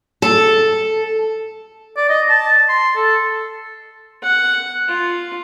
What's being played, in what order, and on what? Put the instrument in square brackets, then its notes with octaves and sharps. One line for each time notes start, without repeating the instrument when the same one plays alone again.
[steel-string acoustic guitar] A4
[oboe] D5
D#5
A5
C6
A4
[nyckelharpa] F#5
F4